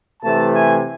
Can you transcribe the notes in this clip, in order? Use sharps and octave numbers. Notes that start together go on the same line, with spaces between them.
C3 E3 A3 A5
G#5